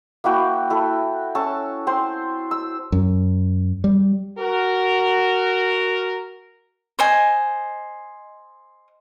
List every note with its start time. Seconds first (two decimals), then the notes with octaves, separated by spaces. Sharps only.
0.24 A#3 E4 F#4 G5
0.70 E4 A4
1.35 C#4 A4 A5 C#6
1.87 C4 C5 C6
2.51 E6
2.92 F#2
3.84 G3
4.38 F#4 A#4
6.99 C5 D#5 G#5